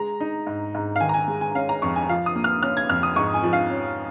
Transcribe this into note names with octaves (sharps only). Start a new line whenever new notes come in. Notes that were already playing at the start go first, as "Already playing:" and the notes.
Already playing: G#3 A#5
D#4
G#2
G#2
F5
D#3 G#5
A#5
G#5
G#3
G#5
C#4 F5
A#5
F2 C#6
G#5
F3 F5
D#6
A#3
F6
C#4 F6
G#6
F2 F6
D#6
G#2 C#6
G#5
F3
F5
C#4